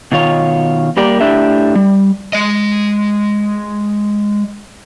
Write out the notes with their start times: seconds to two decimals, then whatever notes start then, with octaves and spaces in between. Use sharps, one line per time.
0.12 B2 D#3 F4 C#5
0.97 G3 A#3 G4 A#4 D5
1.21 A2 D4 G4 E5
1.75 G3
2.33 G#3 D#5